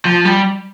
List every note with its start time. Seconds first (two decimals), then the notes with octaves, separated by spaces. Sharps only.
0.05 F3
0.25 G3